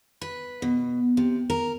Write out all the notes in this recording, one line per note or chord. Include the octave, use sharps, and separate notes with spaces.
B4
B2
C3
A#4